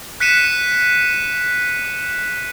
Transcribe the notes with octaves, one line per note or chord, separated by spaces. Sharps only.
F#6 B6 C#7 D#7 E7